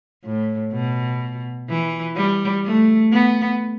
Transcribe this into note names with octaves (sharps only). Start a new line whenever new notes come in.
A2
B2
E3
G3
A3
B3